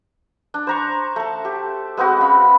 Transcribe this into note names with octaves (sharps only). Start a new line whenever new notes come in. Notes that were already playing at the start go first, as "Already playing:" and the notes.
D4
C5 A#5 C#6
A3 A5
G4
G#3 B3 C4 F#4
C#4 F5 B5